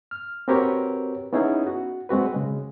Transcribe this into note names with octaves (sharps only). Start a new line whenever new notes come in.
F6
C4 F#4 G4 A#4 B4 C#5
B3 C#4 D#4 E4 G#4
F#4
G#3 C4 F#4 B4
C#3 G#3